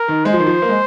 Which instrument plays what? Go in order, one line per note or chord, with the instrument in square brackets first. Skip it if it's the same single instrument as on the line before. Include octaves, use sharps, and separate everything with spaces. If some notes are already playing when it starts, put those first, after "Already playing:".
Already playing: [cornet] A#4
[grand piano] D#3
[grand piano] G#3 [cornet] C5
[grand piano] F3
D#3
F3
A#3
G#3